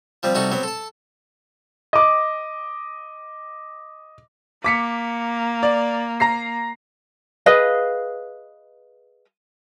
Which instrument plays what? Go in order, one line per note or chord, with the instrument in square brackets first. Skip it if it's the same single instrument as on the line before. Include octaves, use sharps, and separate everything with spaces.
[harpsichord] F3 G3 C4
C3 G3 D#4 F#4 G4 A4
F#3 B3 C4
A4 A5
[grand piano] D#5 D6
[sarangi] A#3 [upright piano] D6 B6 C#7
[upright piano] D5
A#5 A#6 C7
[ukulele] G#4 B4 D#5 F5